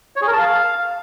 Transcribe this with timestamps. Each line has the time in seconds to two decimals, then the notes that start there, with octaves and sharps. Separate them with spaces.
0.16 C#5
0.22 G#4
0.27 A#4
0.33 A5
0.39 F5